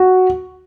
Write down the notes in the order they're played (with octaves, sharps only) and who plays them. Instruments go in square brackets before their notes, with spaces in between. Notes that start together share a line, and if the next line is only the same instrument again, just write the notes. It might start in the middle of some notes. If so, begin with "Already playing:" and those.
Already playing: [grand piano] F#4